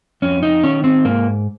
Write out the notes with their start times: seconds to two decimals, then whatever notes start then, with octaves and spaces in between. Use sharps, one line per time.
0.22 F2 C#4
0.43 D#4
0.64 D#3 C#4
0.84 C4
1.05 G#2 A#3